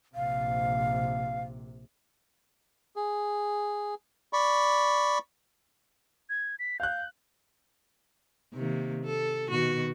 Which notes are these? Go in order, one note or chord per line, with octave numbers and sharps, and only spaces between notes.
A#1 C3 F5
G#4
D5 B5 C#6
G#6
B6
F5 F#6 G6
C3 D#3 A#3
A4
B2 D#3 F#4